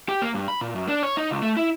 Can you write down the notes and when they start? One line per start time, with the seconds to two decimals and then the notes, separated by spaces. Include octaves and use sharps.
0.09 G4
0.22 A#3
0.35 G2
0.48 B5
0.61 A#2
0.75 F#2
0.88 D4
1.03 C#5
1.17 D#4
1.31 C#2
1.42 A3
1.57 E4